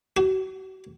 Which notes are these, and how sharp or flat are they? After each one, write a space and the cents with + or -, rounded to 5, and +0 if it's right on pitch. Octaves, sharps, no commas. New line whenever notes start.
F#4 +40